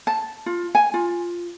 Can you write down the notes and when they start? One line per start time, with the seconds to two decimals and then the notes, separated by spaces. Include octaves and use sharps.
0.07 A5
0.46 F4
0.75 G#5
0.94 F4